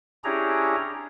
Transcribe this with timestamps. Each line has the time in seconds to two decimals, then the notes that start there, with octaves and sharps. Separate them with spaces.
0.24 C#4 D4 E4 G4 G#4 A#5